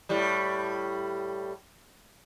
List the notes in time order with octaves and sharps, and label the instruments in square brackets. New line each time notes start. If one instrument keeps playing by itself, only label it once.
[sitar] A2 G3